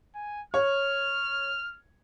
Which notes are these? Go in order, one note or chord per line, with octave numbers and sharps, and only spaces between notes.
G#5
C#5 F6